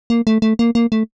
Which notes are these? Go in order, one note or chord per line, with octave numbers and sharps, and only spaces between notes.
A#3
A3
A3
A#3
A#3
A3